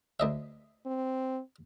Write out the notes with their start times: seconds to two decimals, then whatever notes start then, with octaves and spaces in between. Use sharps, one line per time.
0.20 D2 D#5 E5
0.86 C4